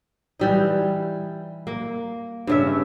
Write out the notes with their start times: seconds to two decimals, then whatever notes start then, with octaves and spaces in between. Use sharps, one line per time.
0.39 E3 G3 D#4
1.67 A#3
2.47 G2 C#3 E5